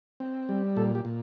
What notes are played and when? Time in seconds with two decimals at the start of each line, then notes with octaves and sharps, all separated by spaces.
0.20 C4
0.49 G3
0.77 A#2 A4
0.95 G4
1.05 A#2